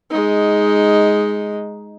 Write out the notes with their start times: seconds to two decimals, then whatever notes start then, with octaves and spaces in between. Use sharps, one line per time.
0.11 G#3 D#4